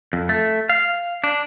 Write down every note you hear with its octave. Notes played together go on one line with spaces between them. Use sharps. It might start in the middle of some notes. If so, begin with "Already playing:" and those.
F2
A3
F5
D4